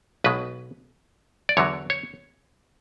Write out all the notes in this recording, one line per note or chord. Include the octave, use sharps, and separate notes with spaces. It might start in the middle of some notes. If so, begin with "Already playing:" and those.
B1 B2 G#3 B4
D5
E2 D3 F#3 C#5
C#5